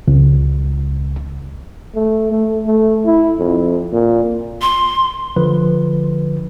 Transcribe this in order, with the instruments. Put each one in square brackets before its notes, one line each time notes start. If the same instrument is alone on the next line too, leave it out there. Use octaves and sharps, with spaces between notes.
[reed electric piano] C#2
[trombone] A3
A3
A3
E4
F2
A#2
[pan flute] C6
[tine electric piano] D3 F3 B4